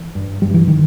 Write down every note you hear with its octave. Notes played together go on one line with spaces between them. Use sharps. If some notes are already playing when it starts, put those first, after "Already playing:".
Already playing: E3
G2
G2 G3
E3
D#3